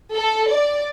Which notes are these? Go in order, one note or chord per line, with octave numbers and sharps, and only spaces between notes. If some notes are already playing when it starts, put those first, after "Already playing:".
A4
D5